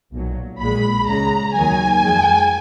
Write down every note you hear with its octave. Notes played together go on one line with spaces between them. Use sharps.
B1 A#2 F#3
A#1 A#2 G#3 B5
C#2 C#3 G#3 A#5
D#2 D#3 F#3 G#5
F2 F3 G#3